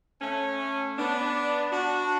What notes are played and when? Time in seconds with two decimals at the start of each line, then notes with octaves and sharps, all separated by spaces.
0.22 A3 C#4
0.97 B3 D4
1.72 D4 F#4